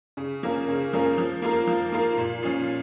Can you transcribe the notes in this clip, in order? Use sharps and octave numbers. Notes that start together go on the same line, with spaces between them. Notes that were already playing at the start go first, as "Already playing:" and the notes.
C#3
F3 A#3 C#4 A#4
C#3
F3 A#3 C#4 A#4
F3
A#3 F4 A#4
F3
A#3 F4 A#4
A#2
F3 C#4 F4